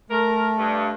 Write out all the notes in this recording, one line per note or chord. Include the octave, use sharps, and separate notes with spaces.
A3 A#4
G2